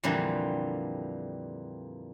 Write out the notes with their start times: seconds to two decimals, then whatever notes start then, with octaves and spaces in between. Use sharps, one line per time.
0.04 F2 A#2 D3 E3 G3